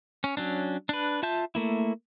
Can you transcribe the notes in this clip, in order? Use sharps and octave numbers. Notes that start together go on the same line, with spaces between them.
C#4
F#3 C#4 D4
D4 B4
F4 E5 A5 G6
A3 A#3 E4